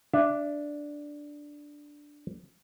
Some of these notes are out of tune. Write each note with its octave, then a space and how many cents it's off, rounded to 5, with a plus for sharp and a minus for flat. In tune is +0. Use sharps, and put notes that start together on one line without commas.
D4 +0 E5 +25